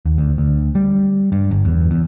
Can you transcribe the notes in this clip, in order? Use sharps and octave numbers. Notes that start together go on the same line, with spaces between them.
D#2
D2
D2
G3
G2
G1
E2
E2